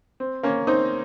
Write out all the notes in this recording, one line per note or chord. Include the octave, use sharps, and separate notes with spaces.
C4
A#3 C#4
C4 D#4